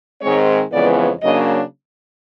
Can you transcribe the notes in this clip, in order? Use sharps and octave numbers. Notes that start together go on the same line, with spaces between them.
G#2 D#3 G#3 C4 C#5
F2 C#3 E3 G#3 B3 D5
C#3 F#3 A#3 D4 D#5